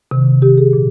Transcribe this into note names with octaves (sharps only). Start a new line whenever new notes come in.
C3 D#3
C3 D#3 G4
G#4
A#2 F3